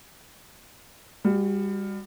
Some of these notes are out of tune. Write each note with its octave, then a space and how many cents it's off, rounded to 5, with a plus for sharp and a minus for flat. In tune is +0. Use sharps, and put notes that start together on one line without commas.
G3 +30 F#4 +0